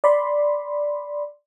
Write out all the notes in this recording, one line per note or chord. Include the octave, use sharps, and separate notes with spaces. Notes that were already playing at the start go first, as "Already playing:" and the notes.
D5 B5 C6